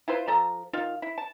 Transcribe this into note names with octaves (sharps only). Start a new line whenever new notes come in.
E4 F4 B4 C5
F3 A4 A#5
D#3 F4 F5
E4
A5